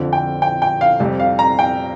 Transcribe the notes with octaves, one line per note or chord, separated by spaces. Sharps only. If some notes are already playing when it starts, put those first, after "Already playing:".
Already playing: F2 D3 F3
G5
G5
G5
F5
F2 C3 G3
F5
A#5
G5